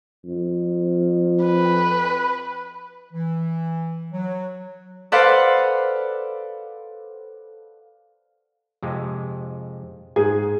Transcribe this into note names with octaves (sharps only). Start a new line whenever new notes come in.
F2
B4
E3
F#3
A4 B4 C5 D5 F5 F#5
F2 C3 G#3
G#2 G#4 G#5